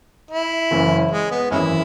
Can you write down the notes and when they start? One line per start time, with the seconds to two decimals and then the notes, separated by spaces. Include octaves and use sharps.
0.31 E4
0.71 F#1 F#2 E3 C#4
1.11 G#3
1.31 B3
1.51 G#1 F#2 E3 G#3 C#4 E4